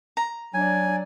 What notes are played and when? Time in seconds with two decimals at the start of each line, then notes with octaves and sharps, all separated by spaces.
0.17 A#5
0.54 F#3 D4 D5 G#5